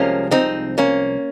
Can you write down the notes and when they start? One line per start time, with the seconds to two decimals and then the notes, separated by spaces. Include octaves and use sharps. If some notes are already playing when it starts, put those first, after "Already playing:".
Already playing: C2 C3 F3 G#3 A#3 C#4
0.31 C4 D#4
0.78 A#3 C#4